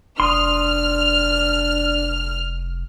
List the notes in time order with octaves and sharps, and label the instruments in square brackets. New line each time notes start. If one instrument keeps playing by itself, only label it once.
[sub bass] F1 [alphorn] D4 [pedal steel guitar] C6 D#6 [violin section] F6